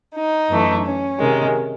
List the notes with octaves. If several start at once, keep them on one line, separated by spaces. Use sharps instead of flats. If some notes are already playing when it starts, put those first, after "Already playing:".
D#4
F#2 E3 A3
C#4
C3 D#3 G#3